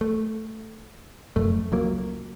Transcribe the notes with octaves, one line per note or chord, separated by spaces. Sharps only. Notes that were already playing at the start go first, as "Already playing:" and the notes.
A3
F1 F#2 A3
C#2 F#3 A#3